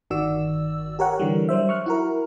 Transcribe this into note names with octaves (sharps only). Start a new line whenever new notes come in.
G1 D#3 F#4 D5 E6
G4 A#4 C#5 F#5
D3 E3 G3
F#3 G3 C5 E5
C#6 F6 F#6
E4 F#4 A#4